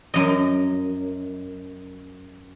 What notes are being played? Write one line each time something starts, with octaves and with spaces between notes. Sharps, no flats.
F#2 D#5